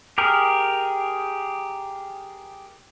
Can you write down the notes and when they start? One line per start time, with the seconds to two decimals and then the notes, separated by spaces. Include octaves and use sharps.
0.18 G4 G#4 A#4